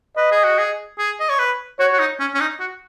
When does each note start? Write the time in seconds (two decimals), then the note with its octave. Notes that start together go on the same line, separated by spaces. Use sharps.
0.17 B4 D#5
0.31 G#4
0.44 F#4
0.58 G#4
0.98 G#4
1.20 D#5
1.29 C#5
1.39 B4
1.79 F#4 C#5
1.93 F#4
1.99 D#4
2.20 C#4
2.34 C#4
2.40 D#4
2.60 F#4